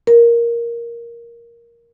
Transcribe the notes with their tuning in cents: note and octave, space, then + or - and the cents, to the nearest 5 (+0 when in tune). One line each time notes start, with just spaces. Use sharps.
A#4 +5